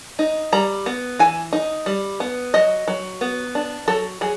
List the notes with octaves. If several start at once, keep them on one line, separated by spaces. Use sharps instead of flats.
D#4
G3 A#5
B3
E3 G#5
D#4
G3
B3
F#3 D#5
F#3
B3
D4
F#3 A4
F#3 G#4